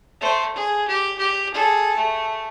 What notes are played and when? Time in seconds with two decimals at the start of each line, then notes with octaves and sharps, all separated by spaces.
0.21 A3 C5
0.55 G#4
0.88 G4
1.18 G4
1.54 G#4 A4
1.97 A3